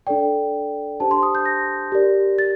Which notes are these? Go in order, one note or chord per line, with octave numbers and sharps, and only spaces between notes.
D4 A4 D5 G5
D4 G4 C5 A5
C6
D#6
G6
A#6
G4 A#4 D5
A6